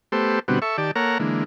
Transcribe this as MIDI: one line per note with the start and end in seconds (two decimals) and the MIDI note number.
0.12 0.39 57
0.12 0.39 59
0.12 0.39 67
0.12 0.39 69
0.12 0.39 72
0.48 0.59 47
0.48 0.59 50
0.48 0.59 55
0.48 0.59 59
0.48 0.59 60
0.48 0.59 66
0.62 0.77 69
0.62 0.77 76
0.62 0.77 85
0.78 0.91 51
0.78 0.91 67
0.78 0.91 74
0.78 0.91 81
0.96 1.18 58
0.96 1.18 69
0.96 1.18 70
0.96 1.18 73
0.96 1.18 78
0.96 1.18 82
1.19 1.44 50
1.19 1.44 52
1.19 1.44 56
1.19 1.44 58